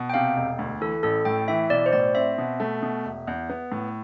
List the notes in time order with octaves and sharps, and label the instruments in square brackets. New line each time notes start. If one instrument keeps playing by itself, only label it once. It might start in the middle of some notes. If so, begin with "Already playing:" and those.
Already playing: [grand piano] B2
[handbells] G5
[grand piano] C3 [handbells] F5
[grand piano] E1
D2
[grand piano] E3 [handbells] A4
[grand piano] A1 [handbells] A4
[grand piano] A2 [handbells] G5
[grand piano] E3 [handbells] E5
[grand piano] B1 [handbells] D5
[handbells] C5
[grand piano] A2 [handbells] D5
[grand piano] C4 [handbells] E5
[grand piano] B2
A3
B2
E1
E2
B3
A2